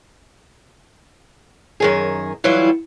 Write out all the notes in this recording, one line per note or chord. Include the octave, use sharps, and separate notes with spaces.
F#2 D#3 G#4
E3 F#3 G3 E4 F4